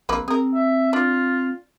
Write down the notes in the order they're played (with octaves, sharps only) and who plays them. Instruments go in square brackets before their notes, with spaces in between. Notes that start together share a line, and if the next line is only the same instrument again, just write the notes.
[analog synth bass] A#1 [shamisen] A#3 C4 B4
[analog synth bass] C4 [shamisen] G#4 A#4
[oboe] E5
[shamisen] D4 [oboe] F4